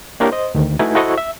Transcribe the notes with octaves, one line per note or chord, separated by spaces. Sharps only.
A#3 D4 E4 G4 A#4 C#5
C5 D#5
D2 D#3
A3 D#4 E4 F#4 B4 G#5
E4 F#4 A4 C5 D#5 C#6
E5